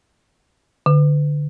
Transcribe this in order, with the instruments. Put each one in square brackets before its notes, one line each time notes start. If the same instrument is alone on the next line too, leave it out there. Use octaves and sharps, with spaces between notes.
[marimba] D3